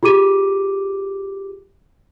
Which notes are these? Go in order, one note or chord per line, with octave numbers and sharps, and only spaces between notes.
F4 G4 G#4 D6 D#7